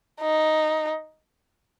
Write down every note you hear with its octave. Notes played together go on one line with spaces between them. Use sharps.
D#4